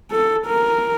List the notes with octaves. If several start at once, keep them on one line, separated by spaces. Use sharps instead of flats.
A4
A#4